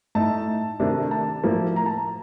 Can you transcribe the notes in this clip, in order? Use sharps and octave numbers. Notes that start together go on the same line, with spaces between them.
A2 A3 D#4 A5
C3 D#3 A3 D4
A5
A2 F3 A#3
A#5
A5